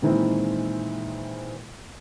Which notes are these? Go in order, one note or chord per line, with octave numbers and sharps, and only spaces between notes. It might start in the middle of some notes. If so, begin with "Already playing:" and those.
A#2 D#3 E3 G#3 C4 E4